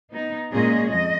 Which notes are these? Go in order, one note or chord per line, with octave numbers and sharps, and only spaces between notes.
B3 D#4
A#2 G#3 C#4 G#4 D#5
F2 D#5